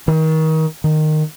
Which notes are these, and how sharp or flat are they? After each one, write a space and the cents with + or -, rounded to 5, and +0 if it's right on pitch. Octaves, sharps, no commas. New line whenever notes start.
D#3 +30
D#3 -15